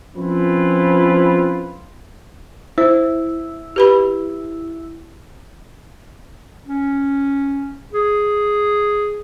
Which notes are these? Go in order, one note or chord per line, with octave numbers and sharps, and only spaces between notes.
F3 C4 C#4 E4 F4 B4
E4 C5
G4 B4 B5
C#4
G#4